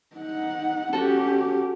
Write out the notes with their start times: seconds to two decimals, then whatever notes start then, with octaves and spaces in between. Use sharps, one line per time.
0.16 D#4 F#5
0.93 C#4 F#4 G4 A4